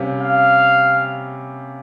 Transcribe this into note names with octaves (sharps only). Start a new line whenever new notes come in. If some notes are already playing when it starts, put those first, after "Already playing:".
Already playing: C3 G3 A#3 C#4
F5